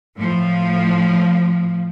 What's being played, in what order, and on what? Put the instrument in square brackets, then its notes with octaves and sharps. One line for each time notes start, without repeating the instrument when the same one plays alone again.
[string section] A2 F3